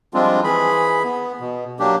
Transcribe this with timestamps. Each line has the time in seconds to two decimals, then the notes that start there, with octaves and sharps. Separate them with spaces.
0.14 F3 G3 G#3 C4 D4 F4
0.44 E3 G#4 B5
1.04 B3
1.40 B2
1.79 F#3 A#3 D4 G4